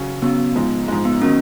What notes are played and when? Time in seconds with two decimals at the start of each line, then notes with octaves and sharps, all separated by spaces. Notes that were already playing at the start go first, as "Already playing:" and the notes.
Already playing: C#3 F#3 C#4
0.22 C#3 F#3 B3 C#4
0.55 G#2 F3 G#3
0.88 G#2 F3 G#3
1.05 B3
1.22 D#3 F#3 A#3 C#4